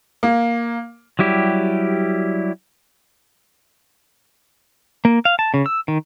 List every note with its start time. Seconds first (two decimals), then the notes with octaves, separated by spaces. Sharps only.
0.23 A#3
1.19 F#3 G3 E4 G4
5.05 A#3
5.25 F5
5.39 A5
5.54 C#3
5.66 E6
5.88 D#3